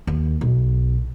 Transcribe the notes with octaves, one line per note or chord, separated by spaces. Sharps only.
D#2
B1